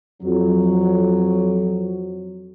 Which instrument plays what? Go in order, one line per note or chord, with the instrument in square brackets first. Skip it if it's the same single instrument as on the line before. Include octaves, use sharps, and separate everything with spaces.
[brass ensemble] F2 F#3